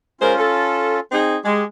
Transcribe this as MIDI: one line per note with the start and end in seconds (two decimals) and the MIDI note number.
0.21 0.34 56
0.21 1.00 61
0.21 1.00 65
0.21 0.34 70
0.21 0.34 72
0.38 0.98 69
1.11 1.36 60
1.11 1.36 63
1.11 1.36 68
1.44 1.62 56
1.44 1.65 67